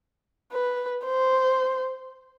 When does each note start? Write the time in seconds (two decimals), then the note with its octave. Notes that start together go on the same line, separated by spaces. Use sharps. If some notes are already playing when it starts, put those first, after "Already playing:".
0.52 B4
1.06 C5